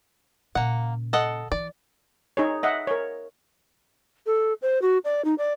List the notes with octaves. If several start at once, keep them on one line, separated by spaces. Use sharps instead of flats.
A#2 C#3 A#3 F#5
A4 D#5 F#5
E3 D5
D#4 G#4 C#5
D#5 E5 F#5
A#4 C#5
A4
C5
F#4
D5
D#4
D5